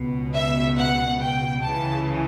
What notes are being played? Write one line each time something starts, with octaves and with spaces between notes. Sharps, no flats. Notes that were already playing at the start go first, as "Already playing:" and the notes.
Already playing: C#2 B2
E5
F#5
G5
C#2 C#3 E3 A5